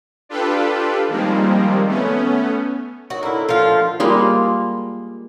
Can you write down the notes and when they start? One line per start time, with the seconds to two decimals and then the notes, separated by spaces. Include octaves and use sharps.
0.29 D4 F4 G4 A4 B4
1.08 D#3 F3 G3 G#3 A#3 C4
1.86 A3 B3 C#4
3.10 D#3 F#3 F#4
3.23 D3 A#3 E4
3.49 F3 F4
3.68 A3
4.00 G3 G#3 A#3 F4